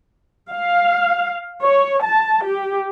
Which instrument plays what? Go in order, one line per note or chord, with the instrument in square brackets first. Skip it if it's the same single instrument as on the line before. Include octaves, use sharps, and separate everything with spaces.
[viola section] F5
C#5
A5
G4